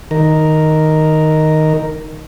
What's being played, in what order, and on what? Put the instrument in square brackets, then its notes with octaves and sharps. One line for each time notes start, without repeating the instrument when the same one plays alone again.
[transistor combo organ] D#3 A#4